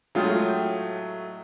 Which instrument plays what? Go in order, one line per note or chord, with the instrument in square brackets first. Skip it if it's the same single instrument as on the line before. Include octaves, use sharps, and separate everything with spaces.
[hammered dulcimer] A2 D#5 G5 [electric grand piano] F#3 A3 [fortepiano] G#3 F4